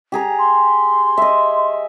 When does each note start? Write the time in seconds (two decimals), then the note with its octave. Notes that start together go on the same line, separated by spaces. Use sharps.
0.12 G4 G#4 A#5
0.39 C6
1.17 D#5 E5